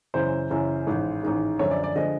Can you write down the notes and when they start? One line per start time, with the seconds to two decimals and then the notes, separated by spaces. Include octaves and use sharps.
0.14 F#2 C#3 E3 C5
0.50 F#2 C#3 E3
0.86 A1 G#2 D#3 G#3
1.23 A1 G#2 D#3 G#3
1.59 F#2 D3 F3 G#3 C#5
1.71 D5
1.84 D5
1.96 D3 F3 G#3 D#5